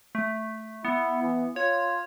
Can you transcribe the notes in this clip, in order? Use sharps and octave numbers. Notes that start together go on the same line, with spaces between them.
A3
B3 E4
E3
F4 C#5